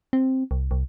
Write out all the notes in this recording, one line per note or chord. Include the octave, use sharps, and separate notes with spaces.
C4
C2
C2